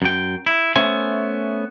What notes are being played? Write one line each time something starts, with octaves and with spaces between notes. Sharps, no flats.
F#2 G5
E4
A3 B3 C#4 C5 E5 G#5